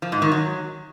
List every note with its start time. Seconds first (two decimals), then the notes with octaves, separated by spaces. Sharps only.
0.02 F3
0.12 G#2
0.22 D#3
0.32 F#3